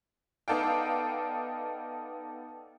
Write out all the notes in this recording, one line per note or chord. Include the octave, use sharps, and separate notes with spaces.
B3 D#4 A4 D5 F5 G5